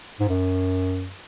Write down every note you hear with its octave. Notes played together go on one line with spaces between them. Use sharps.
G#2
F#2